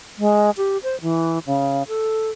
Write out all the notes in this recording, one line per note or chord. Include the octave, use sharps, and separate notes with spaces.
G#3
G4
C5
E3
C#3
A4